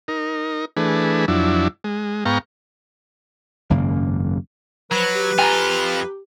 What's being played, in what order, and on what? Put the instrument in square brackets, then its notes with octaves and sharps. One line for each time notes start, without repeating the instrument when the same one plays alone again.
[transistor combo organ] D#4 A#4
E3 A3 D4 G#4 B4
F2 F#3 D4 E4
G#3
G#2 B3 F5 G5 A#5 C#6
[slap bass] G#1 F#2 C#3 A#3
[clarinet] F3 [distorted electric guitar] F#3 [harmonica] B4
[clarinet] G4
[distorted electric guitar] F2 F4 [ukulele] G#5 A#5